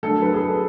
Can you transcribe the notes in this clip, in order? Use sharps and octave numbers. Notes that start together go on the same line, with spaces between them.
F#3 A3 D4 A4
B4
G#4
A4